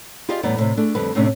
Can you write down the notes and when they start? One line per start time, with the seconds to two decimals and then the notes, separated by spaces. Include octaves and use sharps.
0.29 F4 G4 G#4 D5 D#5 F5
0.43 E2 A2 G3 B3 D#4 D5
0.57 A2 C3
0.77 A3 D4 G#4
0.95 F2 D3 G3 B4
1.15 A2 C3 A3 C#4 D4